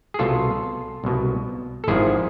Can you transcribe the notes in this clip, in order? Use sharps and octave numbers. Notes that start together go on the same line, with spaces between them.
G#4
C2 B2 F4 A4
C2 B2
A4
G#1 G#2 F3 E4 G#4